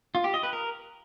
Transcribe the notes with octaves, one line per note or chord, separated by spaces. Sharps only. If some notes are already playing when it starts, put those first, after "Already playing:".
F4
G4
D#5
B4
A#4